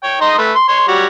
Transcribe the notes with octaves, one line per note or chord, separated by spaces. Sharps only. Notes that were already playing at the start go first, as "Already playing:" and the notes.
C#5 G5
D#4 D#5 C6
A3 B4
C6
C#5 C6
G3 F#4 C#5